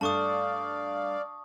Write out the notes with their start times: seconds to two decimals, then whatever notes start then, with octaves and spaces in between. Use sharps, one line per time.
0.01 G2 A3 D5 F5 A5 C#6 D#6